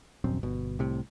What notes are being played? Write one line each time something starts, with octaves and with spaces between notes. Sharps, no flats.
D#1 A#1 F#2 C4
G1 B2
C2 A2 C3